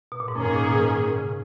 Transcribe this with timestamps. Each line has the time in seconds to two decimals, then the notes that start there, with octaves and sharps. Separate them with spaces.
0.12 B2
0.20 A#2
0.28 G#2
0.36 F#2 D#3 A#3 C#4 G#4
0.45 G#2
0.57 A#2
0.66 B2
1.18 C#3